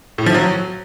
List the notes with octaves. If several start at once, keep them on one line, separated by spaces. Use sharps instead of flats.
A2
F3
F#3